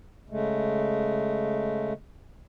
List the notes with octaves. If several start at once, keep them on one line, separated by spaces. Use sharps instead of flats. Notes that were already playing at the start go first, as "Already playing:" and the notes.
C#3 G#3 A3